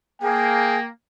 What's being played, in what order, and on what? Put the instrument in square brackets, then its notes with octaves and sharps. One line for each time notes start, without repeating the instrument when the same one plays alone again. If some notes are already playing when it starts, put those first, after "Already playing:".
[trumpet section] A#3 [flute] G#4 [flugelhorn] G5